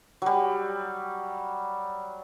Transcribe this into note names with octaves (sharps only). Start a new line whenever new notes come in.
F#3 G3